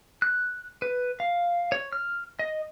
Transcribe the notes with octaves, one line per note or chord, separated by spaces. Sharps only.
F#6
B4
F5
C#5
F6
D#5